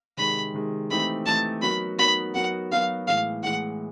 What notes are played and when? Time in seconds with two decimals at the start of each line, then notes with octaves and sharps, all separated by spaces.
0.17 C3 D#3 G#3 B5
0.54 C3 D#3 G#3
0.90 E3 A3 C4 D#4 G4 B5
1.26 E3 A3 C4 D#4 G4 A5
1.62 F#3 B3 D#4 F#4 A#4 B5
1.98 F#3 B3 D#4 F#4 A#4 B5
2.34 F#3 B3 D#4 F#4 A#4 F#5
2.71 F#3 B3 D#4 F#4 A#4 F5
3.07 A2 E3 G#3 F5
3.43 A2 E3 G#3 F#5